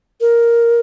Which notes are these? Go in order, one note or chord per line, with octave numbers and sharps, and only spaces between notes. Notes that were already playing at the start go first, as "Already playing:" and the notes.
A#4